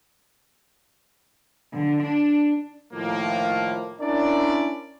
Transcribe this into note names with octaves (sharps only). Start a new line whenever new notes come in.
D3
D4
A2 D#3 F3 A#3
C#4 D4 E4 A#4 D5